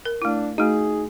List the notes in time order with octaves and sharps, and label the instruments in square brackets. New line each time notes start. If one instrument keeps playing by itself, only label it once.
[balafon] A#4
[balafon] A3 E4 [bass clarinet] D4
[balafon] A3 F#4 [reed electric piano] D#4 [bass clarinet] G#4